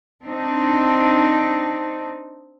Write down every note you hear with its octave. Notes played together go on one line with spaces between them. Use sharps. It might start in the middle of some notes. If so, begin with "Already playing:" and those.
C4 D4 D#4